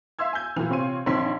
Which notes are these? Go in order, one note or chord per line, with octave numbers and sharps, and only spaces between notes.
E5 F5 C6 E6 G#6
G#5 G6
A#2 E3
C3 C4 F4 C#5 C6 D#7
A#1 D#3 C4 C#5 C6 B6